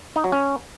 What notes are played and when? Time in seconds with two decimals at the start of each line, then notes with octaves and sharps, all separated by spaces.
0.16 D#4
0.24 F#3
0.32 C#4